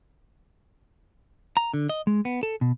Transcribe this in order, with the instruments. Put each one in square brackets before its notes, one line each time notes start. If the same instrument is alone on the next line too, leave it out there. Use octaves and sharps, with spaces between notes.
[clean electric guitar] A#5
D3
D#5
G#3
B3
A4
B2